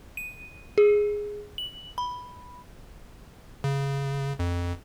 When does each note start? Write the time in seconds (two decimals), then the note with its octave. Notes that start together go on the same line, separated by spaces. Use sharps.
0.17 D#7
0.78 G#4
1.58 F#7
1.98 B5
3.64 C#3
4.39 F2